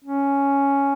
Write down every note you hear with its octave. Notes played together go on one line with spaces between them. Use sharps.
C#4